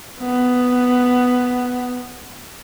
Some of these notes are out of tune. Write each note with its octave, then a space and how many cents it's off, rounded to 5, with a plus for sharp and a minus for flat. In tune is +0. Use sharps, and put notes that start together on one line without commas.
B3 +5